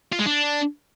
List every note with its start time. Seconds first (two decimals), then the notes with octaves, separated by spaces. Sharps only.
0.13 F4
0.19 G#3
0.26 D4